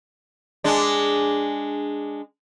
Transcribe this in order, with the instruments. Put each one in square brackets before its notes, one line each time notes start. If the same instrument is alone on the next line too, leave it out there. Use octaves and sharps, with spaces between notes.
[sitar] G#3 D4